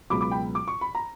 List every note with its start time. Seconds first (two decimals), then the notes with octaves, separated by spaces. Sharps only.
0.10 C#2 B2 F#3 B5 D6
0.21 B5 D6
0.31 G5 B5
0.55 D6
0.68 C#6
0.81 B5
0.95 A#5